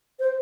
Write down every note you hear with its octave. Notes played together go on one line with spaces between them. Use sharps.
C5